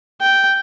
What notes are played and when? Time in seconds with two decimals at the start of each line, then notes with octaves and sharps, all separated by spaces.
0.21 G5